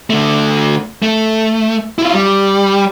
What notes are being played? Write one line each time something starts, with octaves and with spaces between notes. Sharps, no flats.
D3 A3
A3
E4 F4
G3